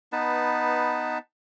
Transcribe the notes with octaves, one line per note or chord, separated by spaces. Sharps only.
B3 D#4 B4 A5